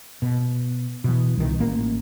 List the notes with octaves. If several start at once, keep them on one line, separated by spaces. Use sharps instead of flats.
B2
B2 E3
C2 A#2 D#3
A1 A#3